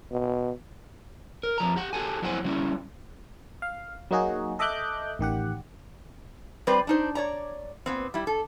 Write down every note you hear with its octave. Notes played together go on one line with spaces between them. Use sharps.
B2
A#4
F2 F3 A#5
G4 F#5
F#4 G4 A4 G#5
F2 F#3 E4 C5 F#5 G#5
F#3 G3 C#4 E4
F5
F#3 A#3 D#4 F#4 G#4
A4 D#5 E5 D6 F#6 G6
A1 D#3 G4 F#5
G3 C4 B4 C5 D5
D4 D#4 C5
C#5 D5 A#5
A#2 B3 C4
G3 E4
A4